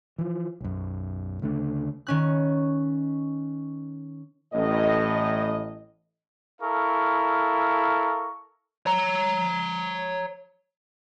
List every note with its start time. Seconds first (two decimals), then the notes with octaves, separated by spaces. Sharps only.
0.18 E3 F3
0.61 B1 F#2
1.42 D2 C#3 A3 D4
2.07 D#3 C#4 F#6
4.54 A1 A2 D#5
6.62 E4 A4 A#4 F5 C#6
8.86 C#5 A#5